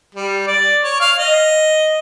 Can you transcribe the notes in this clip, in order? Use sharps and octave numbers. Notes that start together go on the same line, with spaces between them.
G3
D5
C#5
F5
D#5